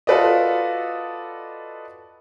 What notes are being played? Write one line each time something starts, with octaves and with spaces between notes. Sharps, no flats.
F4 F#4 A4 B4 D5 D#5